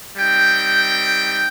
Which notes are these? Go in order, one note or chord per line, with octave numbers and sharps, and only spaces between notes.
G3 C4 D#4 G5